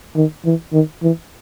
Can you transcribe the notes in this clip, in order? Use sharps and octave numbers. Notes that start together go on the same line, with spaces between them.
D#3
E3
D#3
E3